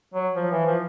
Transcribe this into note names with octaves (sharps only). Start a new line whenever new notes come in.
F#3
F3
E3
F3